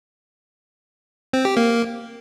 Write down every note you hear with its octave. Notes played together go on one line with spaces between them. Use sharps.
C4
G4
A#3